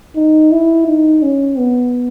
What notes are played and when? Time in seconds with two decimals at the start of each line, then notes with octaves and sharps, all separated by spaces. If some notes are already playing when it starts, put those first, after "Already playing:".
0.15 D#4
0.52 E4
0.87 D#4
1.22 C#4
1.58 B3